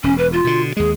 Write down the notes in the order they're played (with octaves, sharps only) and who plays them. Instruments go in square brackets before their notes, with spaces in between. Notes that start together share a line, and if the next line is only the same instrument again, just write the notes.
[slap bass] E1 [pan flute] C#4
[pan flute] B4
F4
[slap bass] B2 D3
[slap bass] D#2 G#3 [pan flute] G#4